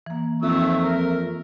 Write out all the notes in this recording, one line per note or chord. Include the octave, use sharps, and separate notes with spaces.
E3 A#3
F2 D#3 E5 C#6 E6
A#4